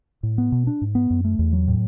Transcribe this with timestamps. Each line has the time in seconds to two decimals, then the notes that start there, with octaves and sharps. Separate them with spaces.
0.23 A2
0.38 B3
0.52 B2
0.67 D4
0.81 G#2
0.95 B3
1.10 F#2
1.25 A3
1.39 E2
1.53 F#3
1.68 A2